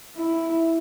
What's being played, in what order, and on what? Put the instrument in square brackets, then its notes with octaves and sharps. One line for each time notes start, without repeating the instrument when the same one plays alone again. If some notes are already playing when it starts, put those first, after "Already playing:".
[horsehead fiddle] E4